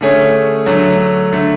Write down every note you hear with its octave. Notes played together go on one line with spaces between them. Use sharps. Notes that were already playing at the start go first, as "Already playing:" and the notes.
D3 A3 C#4 G#4 C#5
D3 F#3 A3
D3 A3